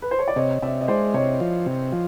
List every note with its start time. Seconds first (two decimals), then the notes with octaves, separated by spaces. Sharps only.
0.02 B4
0.11 C5
0.19 C#5
0.28 D5
0.36 C3 C#5 D#5
0.62 C3 D5 E5
0.81 D#5
0.88 G#3 C5 D5
1.14 C3 C#5 D#5
1.40 F3
1.66 C3
1.92 F3